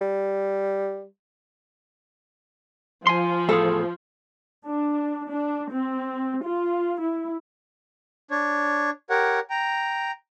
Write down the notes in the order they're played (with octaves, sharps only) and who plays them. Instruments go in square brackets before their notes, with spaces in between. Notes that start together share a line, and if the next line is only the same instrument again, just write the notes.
[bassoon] G3
[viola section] F3 [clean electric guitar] G#5 C6
[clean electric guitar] E2 A2 G#4 [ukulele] A4
[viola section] D4
D4
C4
F4
E4
[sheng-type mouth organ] D4 C#5
G4 A#4 C#5 F#5
G5 A#5